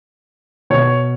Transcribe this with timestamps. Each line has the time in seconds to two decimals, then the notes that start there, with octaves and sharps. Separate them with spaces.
0.70 B2 C#5